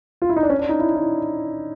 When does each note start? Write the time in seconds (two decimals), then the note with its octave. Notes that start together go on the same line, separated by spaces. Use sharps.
0.22 F4
0.29 E4
0.37 D#4
0.43 D4
0.50 C#4
0.59 D4
0.69 D#4
0.79 E4
0.95 E4